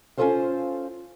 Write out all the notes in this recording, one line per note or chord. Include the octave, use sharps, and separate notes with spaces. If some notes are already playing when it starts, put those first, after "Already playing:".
C#4 F4 G#4 A4 C5 F5